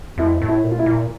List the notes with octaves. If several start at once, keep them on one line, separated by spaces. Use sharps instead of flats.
F2 E4
A2
E4
A#2
F4
E4
A#2